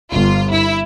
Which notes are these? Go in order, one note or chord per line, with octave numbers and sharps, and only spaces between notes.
G1 F4
E4